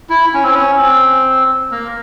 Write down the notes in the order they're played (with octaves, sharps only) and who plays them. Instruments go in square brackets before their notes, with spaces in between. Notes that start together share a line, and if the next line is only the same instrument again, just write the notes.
[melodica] E4
C#4
C4
C#4
C4
A#3